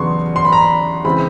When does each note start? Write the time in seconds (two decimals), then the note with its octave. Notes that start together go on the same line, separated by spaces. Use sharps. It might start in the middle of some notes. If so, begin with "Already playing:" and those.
Already playing: E2 C#3 F#3 B3 D4 C6 C#6
0.36 C6
0.45 B5
0.52 A#5
0.61 B5
1.04 C#3 E3 G#3 C4 B5